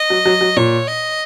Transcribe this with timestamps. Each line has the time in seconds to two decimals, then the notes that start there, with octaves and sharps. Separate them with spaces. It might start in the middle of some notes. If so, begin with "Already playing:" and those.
Already playing: D#5
0.10 F#3
0.26 F#3
0.41 F#3
0.57 A#2 C#5
0.88 D#5